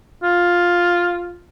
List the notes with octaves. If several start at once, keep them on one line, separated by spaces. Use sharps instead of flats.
F4